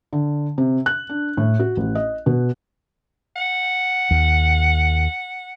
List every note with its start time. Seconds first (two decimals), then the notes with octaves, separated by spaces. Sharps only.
0.13 D3
0.58 C3
0.86 F#6
1.09 D4
1.37 A2
1.60 F#4
1.77 A1
1.95 D#5
2.26 B2
3.36 F#5
4.11 D#2